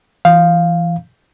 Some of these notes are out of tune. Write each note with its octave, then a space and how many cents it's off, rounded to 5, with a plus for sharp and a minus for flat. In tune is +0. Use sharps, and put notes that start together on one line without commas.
E3 +25 F5 +0